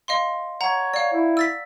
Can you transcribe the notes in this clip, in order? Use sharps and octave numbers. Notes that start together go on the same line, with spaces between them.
D#5 F5 C6
C#5 F#5 A#5
D5 F5
E4
E6 A6 B6